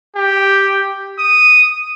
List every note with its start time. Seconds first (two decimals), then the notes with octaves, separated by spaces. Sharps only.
0.15 G4
1.18 D#6